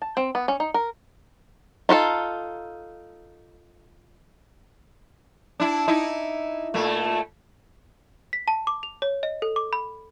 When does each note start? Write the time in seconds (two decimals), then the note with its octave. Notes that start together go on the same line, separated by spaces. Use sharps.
0.02 A5
0.17 C4
0.35 B3
0.48 C#4
0.60 D#4
0.74 A#4
1.89 D#4 F4 F#4 A4
5.60 D4 E4
5.88 D#4 E4
6.74 A#2 A3
8.33 B6
8.48 A5
8.67 D6
8.83 F7
9.02 C#5
9.23 D#5
9.42 A4
9.56 D6
9.73 B5